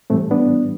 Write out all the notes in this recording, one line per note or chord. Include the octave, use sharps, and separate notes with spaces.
A2 E3 G3 A3 C4
B3 D4